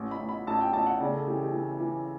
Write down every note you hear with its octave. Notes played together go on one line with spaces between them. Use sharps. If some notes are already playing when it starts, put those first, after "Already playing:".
Already playing: A1
B5
A1
B5
A1 A5
G5
A1 A5
F#5
C#3 D5
A4
E3 G4
G4
E3
E3